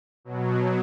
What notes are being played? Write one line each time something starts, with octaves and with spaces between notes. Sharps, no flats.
B2 F#3